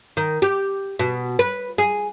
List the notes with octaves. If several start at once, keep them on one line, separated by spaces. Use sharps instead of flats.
D#3
G4
B2
B4
G#4